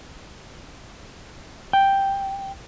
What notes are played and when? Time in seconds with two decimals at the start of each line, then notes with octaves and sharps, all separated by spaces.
1.73 G5